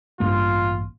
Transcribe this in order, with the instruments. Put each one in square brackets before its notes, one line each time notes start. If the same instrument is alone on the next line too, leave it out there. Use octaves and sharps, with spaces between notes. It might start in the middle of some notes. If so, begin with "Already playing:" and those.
[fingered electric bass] A1 G2 A#3 [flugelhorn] F4